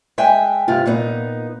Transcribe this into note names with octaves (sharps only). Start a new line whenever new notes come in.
G#3 E5 G5 G#5
G2 C3 F4
A#2 B3 D#4